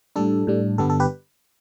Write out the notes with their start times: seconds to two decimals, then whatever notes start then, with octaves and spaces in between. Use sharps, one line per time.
0.16 A2 G3 D4 A4
0.47 A2 G3 D4
0.78 G2 D3 G3 B3 D4 A4
0.90 A4
1.00 G4 B4